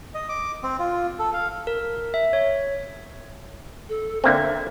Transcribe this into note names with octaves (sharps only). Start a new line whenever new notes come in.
D#5
D6
C4
F4
A4
F5
A#4
E5
C#5
A4
D3 A#3 C4 E5